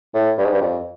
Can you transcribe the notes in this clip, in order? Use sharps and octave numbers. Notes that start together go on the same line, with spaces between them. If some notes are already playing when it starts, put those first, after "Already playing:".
A2
G2
G#2
G2
F2